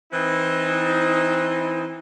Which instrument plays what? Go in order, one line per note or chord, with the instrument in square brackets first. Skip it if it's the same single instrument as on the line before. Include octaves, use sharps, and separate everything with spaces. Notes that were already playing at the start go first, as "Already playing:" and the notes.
[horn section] E3 C4 D#4